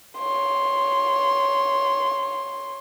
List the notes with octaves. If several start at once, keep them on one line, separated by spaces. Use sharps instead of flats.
C#5 C6